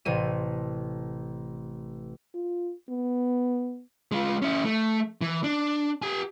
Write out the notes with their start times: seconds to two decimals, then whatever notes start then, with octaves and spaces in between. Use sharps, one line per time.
0.05 A1 C3 A3 D#7
2.34 F4
2.89 B3
4.12 G#3 F4
4.42 C#4 E4
4.65 A3
5.21 E3
5.44 D4
6.02 G4 G#5